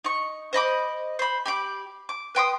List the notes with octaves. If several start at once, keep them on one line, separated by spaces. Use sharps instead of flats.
D#4 C#6
C5 D#5 B5 D6
C5 B5
G4 B5 D6
D6
B4 G5 C6 D#6